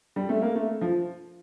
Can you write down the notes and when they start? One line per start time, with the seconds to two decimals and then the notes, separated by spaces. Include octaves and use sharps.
0.16 G3
0.29 A3
0.42 A#3
0.55 A3
0.81 F3